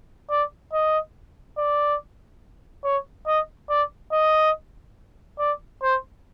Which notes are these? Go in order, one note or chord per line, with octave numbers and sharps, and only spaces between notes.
D5
D#5
D5
C#5
D#5
D5
D#5
D5
C5